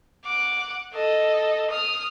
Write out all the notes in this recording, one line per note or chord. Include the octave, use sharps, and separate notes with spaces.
F#5 D6
A4 D#5
D#6 F6